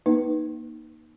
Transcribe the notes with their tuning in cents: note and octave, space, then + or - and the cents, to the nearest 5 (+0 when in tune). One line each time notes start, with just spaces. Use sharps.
A#3 +30 D#4 +0 B4 -10